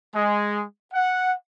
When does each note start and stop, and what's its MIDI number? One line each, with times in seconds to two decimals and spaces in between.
0.15 0.64 56
0.93 1.33 78